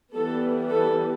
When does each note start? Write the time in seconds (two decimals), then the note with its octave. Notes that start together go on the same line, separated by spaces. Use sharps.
0.14 E3 G3 B3 A4
0.70 A4